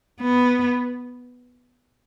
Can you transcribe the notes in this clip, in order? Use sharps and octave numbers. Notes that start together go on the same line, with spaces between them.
B3